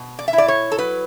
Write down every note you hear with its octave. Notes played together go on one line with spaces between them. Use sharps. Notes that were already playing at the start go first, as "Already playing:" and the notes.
Already playing: B2
D5
E5
E4
D5
C#5
A4
F#3 B4